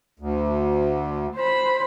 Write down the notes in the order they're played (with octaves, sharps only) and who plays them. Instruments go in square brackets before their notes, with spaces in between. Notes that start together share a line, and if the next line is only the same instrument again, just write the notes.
[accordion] D2
[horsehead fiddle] C5 B5